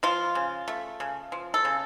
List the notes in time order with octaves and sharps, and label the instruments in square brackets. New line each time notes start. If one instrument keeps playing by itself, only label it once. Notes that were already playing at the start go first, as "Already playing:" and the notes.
[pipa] F3 F4
C#3
A3
C#3
F3
A4
C#3